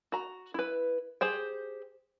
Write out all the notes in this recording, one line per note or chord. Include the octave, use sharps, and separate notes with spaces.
F#4 A#5
E4 B4
G4 G#4 C5 G5